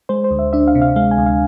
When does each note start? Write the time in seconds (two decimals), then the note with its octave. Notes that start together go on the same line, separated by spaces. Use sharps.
0.09 G#3 C5
0.24 C5
0.31 D2
0.39 E5
0.53 D4 E5
0.68 F5
0.75 C3
0.82 F5
0.96 G#3 F5
1.11 G#5
1.18 D2
1.26 F5